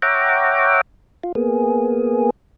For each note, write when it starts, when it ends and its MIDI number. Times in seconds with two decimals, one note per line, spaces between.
0.02 0.81 73
0.02 0.81 76
0.02 0.81 78
0.02 0.81 79
0.02 0.81 82
0.02 0.81 86
1.23 1.32 65
1.35 2.30 58
1.35 2.30 59
1.35 2.30 68